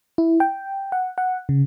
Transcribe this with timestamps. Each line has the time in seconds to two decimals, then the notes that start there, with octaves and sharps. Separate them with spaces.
0.18 E4
0.40 G5
0.92 F#5
1.18 F#5
1.49 C#3